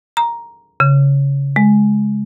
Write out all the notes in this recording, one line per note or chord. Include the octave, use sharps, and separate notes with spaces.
A#5
C#3
G#3